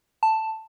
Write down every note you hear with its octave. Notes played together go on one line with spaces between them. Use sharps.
A5